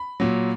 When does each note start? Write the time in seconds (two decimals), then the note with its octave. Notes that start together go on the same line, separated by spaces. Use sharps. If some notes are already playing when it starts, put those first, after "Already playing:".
Already playing: B5
0.20 A#2 F#3